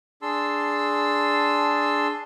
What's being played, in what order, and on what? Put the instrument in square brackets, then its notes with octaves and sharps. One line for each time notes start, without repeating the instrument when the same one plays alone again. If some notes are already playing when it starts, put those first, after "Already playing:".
[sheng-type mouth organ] D4 G#4 A5 C6 E6